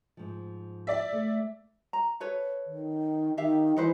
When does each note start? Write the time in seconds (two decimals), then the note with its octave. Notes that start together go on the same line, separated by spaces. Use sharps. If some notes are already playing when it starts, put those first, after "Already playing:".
0.17 G#2 F3
0.87 D5 E5
1.13 A3
1.93 A#5
2.20 A4 B4 C#5
2.66 D#3
3.37 D#3 G4 E5 F5
3.76 E3 D#4 B4 C5